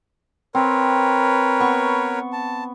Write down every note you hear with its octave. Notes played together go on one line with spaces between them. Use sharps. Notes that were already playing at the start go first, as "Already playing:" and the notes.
C4 A#4 B4 C#5
B3 C#6
A5